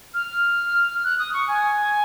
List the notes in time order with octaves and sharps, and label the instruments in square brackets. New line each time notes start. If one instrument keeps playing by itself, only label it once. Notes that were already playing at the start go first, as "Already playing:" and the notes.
[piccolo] F6
F#6
D#6
C#6
G#5